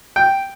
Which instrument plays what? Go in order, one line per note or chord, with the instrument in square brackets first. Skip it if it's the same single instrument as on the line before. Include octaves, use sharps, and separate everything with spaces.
[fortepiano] G5